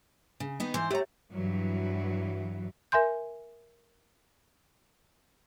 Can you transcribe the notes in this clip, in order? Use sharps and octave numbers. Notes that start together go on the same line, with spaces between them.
C#3
D#3 B3 D#4
G#2 E3 C5
A3 E4 G4 C#5 A#5
G2 E3 F#3
A#4 E5 G#5 C6 G6